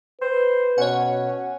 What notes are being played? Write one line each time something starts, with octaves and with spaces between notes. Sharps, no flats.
B4 C5
B2 C#4 C#5 F#5